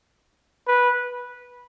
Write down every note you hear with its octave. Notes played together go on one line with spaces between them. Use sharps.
B4